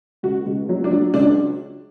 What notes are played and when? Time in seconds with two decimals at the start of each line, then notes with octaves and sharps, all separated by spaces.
0.23 C#2 F#4
0.46 C#2
0.69 F#3
0.84 D4
0.91 F#3
1.14 C#2 D4